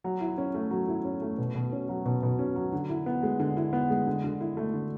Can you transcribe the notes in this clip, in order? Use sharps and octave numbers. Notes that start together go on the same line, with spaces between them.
F#3
E4
C#4
A3
F#3
E4
C#4
A3
B2
B2
C#4
F#3
B2
B2
C#4
F#3
D3
E4
B3
G#3
D3
E4
B3
G#3
D3
D3
E4
A3
D3